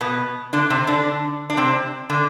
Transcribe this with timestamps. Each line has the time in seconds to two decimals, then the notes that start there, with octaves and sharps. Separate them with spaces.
0.01 B2 B3
0.53 D3 D4
0.70 C3 C4
0.87 D3 D4
1.50 D4
1.57 C3 C4
2.10 D3 D4